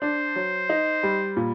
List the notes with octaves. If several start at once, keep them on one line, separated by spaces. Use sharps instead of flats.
D4 C5
F#3
D#4
G3
A#2